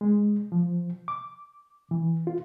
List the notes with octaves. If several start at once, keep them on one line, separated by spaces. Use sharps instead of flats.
G#3
F3
D6
E3
F4